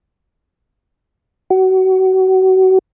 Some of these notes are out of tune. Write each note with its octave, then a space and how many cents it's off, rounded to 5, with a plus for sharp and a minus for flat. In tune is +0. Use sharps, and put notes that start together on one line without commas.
F#4 +30